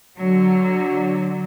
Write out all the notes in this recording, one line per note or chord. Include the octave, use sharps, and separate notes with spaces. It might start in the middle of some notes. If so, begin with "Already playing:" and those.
D3 F#3